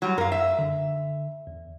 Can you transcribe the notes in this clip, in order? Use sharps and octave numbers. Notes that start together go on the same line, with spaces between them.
F#3 G3
F#2 A#4 F5
E5
D3
E2